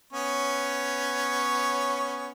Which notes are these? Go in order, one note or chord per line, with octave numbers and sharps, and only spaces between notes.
B3 C#4 C#5